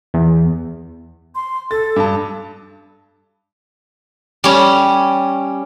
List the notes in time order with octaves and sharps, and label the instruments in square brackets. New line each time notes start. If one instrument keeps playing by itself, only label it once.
[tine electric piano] E2
[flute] C6
[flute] A4 [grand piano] A6
[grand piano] G2 A5
[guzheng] G3 C#4